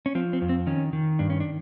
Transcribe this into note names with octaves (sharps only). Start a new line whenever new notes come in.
C#4
F3 C4
C4
F2
C4
D#3 C#4
D#3
G2 D4
C#4
D4